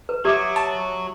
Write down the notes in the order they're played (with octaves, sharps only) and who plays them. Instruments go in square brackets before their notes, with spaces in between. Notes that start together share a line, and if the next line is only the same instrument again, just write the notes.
[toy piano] B4
[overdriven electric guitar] F#3 F#4 [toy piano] G4 D6 [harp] E5 D#6 G#6
[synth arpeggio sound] A5